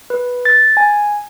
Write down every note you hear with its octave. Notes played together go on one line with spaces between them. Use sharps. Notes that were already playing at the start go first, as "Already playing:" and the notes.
B4
A6
G#5